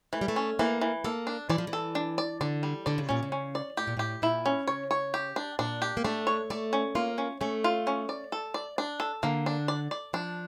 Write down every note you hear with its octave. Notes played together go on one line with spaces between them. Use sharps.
E3 A3
G3
A3
C#4
E3 A#3
E3
A#3 A4
D4
E3 D5
F3
E3
A4
D4
D5
D3 D5
G3
D3 D5
C#3
A#2 C#4
C#3
C#4
D5
A2 G4
A#2
A2 G4
A#2 E4
C#4
C#3 C#5
C#5
G4
D4
A#2 D4
G4
A#3
A3 D4
C#5
A3 D5
C#4
A#3 F4
C#4
A3 C#4
F4
C#4
D5
A4
D5
D4
A4
D3 A#3
D4
D5
D5
F3 D4